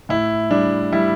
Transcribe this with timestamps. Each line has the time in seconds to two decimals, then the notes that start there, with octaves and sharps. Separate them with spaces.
0.09 A2 E4
0.50 G3 D4
0.92 G3 E4